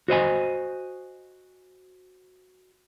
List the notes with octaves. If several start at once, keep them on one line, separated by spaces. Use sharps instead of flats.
F#4 C5 D#5 G#5